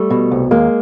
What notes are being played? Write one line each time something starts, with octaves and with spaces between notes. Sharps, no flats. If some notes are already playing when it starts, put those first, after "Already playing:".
Already playing: G3 A3
B2
C2
D#2 G#3 A#3